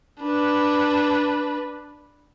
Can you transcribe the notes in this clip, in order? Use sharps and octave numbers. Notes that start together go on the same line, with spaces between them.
D4 B4